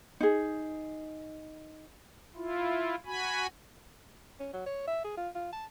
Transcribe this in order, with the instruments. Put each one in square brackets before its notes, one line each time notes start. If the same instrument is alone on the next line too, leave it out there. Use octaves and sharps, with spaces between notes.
[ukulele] D#4 G#4
[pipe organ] E4 F4
F#4 G#5 B5
[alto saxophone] C#4
F#3
C#5
E5
G#4
F4
F4
A5